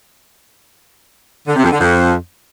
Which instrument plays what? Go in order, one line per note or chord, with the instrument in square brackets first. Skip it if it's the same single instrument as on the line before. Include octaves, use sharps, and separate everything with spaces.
[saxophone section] D3
C3
F2
D3
F2